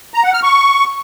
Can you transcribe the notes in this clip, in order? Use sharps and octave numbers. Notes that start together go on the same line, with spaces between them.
A#5
F#5
F6
C#6